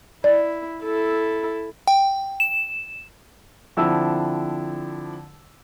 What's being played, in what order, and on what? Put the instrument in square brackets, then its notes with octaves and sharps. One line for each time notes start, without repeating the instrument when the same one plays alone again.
[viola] E4 [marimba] D5
[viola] E4 A4
[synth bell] G5
E7
[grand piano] D3 F3 C4 E4 E6